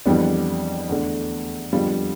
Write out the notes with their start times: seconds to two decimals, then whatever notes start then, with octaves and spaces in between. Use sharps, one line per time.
0.06 F2 E3 G3 B3 D4
0.89 E2 D3 A3 D4
1.72 F2 D3 G3 B3 F4